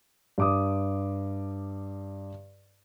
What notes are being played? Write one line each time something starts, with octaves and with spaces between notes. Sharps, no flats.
G2 D6 D#6